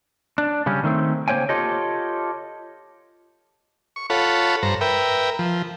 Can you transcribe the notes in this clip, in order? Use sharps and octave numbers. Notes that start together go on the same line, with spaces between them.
D4
C#3 G3 C#4
D#3 A3 C4
C#3 A#3 C5 C#5 G5 G#5
F4 G4 A4 C#5 D#5
C#6
F4 A4 C#5 F#5 B5
G2 C5 A#5
A#4 B4 E5 G5
F3